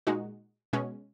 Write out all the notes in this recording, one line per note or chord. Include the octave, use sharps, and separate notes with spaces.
A#2 G#3 D#4 F#4
B2 G#3 C#4